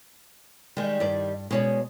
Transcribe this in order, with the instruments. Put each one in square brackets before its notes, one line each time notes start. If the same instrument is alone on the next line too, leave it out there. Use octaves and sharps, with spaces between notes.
[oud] D#3 G3 [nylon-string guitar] G#3
[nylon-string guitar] G2 D5
[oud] B2 C#4 [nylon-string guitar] G#3 C#5 D5